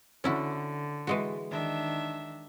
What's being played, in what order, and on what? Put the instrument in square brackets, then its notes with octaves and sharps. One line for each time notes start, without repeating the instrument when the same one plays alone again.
[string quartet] D3 [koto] C#4 E4 F#4
[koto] E3 G#3 F#4
[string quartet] D#3 D4 E5